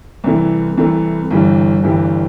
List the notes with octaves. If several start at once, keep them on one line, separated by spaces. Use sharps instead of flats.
C2 C3 E3 A3
C2 C3 E3 A3
G1 G2 E3 G3
G1 G2 E3 G3